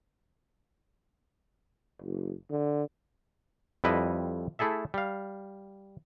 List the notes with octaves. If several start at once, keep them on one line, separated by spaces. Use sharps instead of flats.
F#1
D3
F2 G3 E4 B4 D#5
A3 E4 G#4 A4 E5
G3 F5